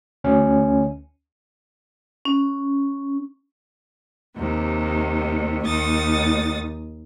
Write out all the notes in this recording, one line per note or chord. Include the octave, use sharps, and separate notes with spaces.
D2 C#4
C#4
D#2 C3
D#2 D#6 A6